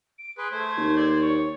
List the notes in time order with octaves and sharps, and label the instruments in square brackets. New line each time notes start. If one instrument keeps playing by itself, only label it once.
[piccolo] D7
[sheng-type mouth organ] G#4 B4 [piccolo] C6
[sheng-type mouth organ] A3 C5 [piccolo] G#6
[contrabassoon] D#2
[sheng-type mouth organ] C5 D5
[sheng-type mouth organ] C#5 [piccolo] C#6